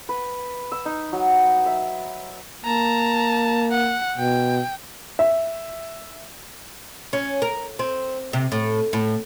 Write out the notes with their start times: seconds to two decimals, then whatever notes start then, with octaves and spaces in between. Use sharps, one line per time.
0.09 B4
0.72 E6
0.85 D#4
1.13 F#3
1.66 E5
2.65 A#3 A5 A#5
3.71 F#5
4.18 B2 G5
5.19 E5
7.13 C#4
7.42 A#4
7.79 C4
8.33 C3
8.52 A2
8.93 A2